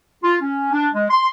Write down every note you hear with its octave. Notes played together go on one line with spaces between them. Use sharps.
F4
C#4
D4
G#3
C6